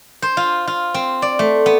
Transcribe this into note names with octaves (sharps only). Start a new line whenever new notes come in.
C5
F4
F4
C4
D5
A3
B3